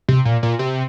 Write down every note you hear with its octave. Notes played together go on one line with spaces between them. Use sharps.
C3
A#2
A#2
C3